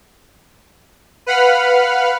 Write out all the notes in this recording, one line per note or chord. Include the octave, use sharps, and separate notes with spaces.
B4 F5 F#5 B5 F6